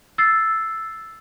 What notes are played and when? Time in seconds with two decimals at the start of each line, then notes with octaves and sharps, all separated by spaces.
0.18 E6 A6 C7